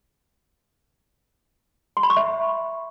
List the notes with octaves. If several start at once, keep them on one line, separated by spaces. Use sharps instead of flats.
C6
B5
C#6
E5